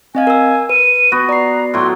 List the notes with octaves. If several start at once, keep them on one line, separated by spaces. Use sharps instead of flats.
C4 D#5 F5 G#5
A#4 E6
B4 D#7
B3 F#4
D5 A#5 C7
A2 F#3 C6